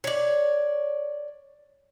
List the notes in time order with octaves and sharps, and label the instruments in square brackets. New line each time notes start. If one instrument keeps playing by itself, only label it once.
[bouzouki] C#5 D5